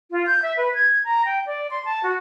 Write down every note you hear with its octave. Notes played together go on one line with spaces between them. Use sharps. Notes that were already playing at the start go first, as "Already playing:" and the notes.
F4
G6
E5
B4
G#6
A#5
G5
D5
C6
A5
F#4